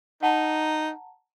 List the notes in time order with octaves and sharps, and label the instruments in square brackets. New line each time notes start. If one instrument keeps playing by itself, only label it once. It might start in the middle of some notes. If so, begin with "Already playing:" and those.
[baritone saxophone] D#4 [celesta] F#5 A5 A#5